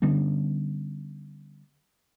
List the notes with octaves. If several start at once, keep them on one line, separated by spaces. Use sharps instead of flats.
D3 G3 B3 C#4